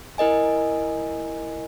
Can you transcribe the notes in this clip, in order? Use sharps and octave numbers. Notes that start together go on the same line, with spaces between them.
E4 A#4 D#5 G#5